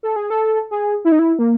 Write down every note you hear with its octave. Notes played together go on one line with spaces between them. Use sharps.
A4
G#4
A4
G#4
E4
D#4
E4
A#3